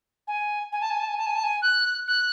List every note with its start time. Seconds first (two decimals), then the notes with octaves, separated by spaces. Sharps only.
0.28 G#5
0.72 G#5
0.81 A5
0.90 G#5
1.00 A5
1.08 G#5
1.18 A5
1.26 G#5
1.35 A5
1.44 G#5
1.62 F#6
2.08 F#6